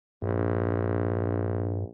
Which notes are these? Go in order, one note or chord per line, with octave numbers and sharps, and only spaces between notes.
A#1 G2